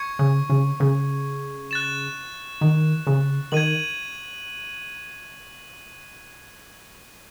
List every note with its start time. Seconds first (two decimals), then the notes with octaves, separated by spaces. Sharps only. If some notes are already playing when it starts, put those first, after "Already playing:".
Already playing: C#6 G#6 C#7
0.19 C#3
0.50 C#3
0.80 C#3
1.71 F#6 A6 E7
2.61 D#3
3.07 C#3
3.52 D#3 G#6 D#7 F#7